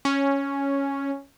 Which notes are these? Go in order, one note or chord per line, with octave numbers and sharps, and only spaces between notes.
C#4